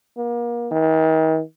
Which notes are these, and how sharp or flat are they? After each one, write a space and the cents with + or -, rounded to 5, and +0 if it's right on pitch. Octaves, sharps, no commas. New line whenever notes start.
A#3 +35
D#3 +40